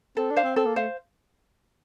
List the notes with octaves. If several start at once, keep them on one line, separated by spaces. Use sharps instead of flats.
C4 A4
D4
C5 F5
C4
C4 A4
A#3
A3 C5 F5